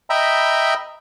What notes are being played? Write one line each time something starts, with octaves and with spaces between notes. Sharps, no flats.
D#5 E5 G5 A#5 B5 E6